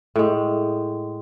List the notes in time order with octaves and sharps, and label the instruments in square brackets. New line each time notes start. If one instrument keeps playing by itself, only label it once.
[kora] A2 G#3